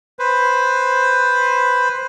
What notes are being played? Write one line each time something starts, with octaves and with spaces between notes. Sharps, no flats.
B4 C5